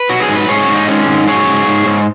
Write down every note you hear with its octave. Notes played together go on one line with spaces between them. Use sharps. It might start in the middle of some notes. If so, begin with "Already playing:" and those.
Already playing: B4
F#3 F#4
G#4
G#2
B4
G#2 G#4 C#5
F#4
G#2
D#4
D#3 G#3 C#4
G#2
F#3 G#4 C#5
G#2
G#2
G#2